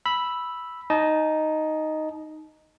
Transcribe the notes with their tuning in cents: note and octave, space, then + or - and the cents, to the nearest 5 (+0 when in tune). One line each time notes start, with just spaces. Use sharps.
B5 -5 E6 +0
D#4 +0 D#5 +0 A5 -30